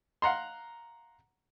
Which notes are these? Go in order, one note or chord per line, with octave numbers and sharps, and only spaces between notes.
F5 F#5 A#5 C6